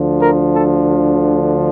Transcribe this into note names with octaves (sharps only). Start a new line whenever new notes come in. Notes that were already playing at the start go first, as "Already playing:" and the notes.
Already playing: D2 D3 F3
A#4
A4